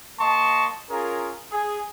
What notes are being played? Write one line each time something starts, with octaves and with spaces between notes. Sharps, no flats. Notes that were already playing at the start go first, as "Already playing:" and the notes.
A#3 D#5 A5 C6 C#6
C#4 F4 G#4 A#4
G#4